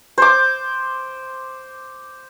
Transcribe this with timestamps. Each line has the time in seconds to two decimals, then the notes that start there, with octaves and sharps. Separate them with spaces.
0.18 C5 D6